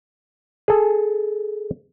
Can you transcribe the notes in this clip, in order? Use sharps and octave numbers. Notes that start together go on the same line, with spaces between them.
G#4 A4